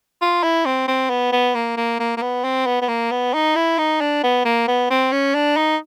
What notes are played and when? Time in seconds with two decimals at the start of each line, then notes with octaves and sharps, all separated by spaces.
0.21 F4
0.43 E4
0.66 C4
0.88 C4
1.10 B3
1.32 B3
1.55 A#3
1.77 A#3
1.99 A#3
2.17 A#3
2.22 B3
2.44 C4
2.66 B3
2.81 B3
2.89 A#3
3.11 B3
3.34 D#4
3.55 E4
3.78 D#4
4.01 D4
4.23 B3
4.45 A#3
4.68 B3
4.90 C4
5.12 C#4
5.34 D4
5.57 D#4